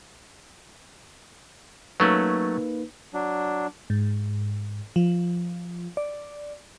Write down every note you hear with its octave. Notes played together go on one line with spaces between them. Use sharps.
F#3 A3 A#3 C#4 D#4 B4
F#3 D4
G#2
F3
D5